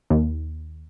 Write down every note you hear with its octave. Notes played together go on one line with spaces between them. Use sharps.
D#2